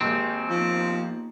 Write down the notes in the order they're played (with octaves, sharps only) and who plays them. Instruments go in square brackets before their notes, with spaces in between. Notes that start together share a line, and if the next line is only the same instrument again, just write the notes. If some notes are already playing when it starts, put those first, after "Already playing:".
[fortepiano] G#1 D#2 [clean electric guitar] C4 [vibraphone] F#4 G#5
[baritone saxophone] F3 [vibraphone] A#3 B3 D#4